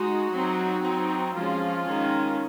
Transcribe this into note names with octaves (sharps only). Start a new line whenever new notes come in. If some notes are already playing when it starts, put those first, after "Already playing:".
Already playing: G#3 D#4 F#4
F#3 C4 D#4
F#3 C4 D#4
F3 G#3 C#4 F4
D#3 G#3 C#4